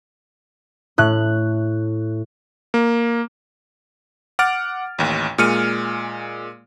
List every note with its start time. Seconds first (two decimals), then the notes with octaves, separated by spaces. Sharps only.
0.98 A2 F#6
2.74 A#3
4.39 F#5 D6 F6 A6 D7
4.98 A1 D#2
5.38 A#2 G#3 F6 C#7 D#7